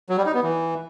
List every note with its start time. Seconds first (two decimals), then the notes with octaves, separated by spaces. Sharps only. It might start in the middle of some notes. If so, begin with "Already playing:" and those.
0.09 F#3
0.18 G3
0.26 D#4
0.34 B3
0.43 E3